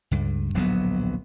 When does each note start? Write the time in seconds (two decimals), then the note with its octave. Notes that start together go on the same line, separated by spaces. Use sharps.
0.11 C#2 G2
0.54 D1 A#1 F#3 B3